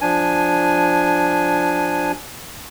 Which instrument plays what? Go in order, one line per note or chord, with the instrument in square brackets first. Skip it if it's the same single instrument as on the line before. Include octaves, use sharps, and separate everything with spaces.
[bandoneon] F3 D4 G#5